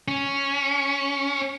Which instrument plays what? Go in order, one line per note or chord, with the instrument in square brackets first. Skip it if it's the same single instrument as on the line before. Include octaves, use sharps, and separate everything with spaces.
[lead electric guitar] C#4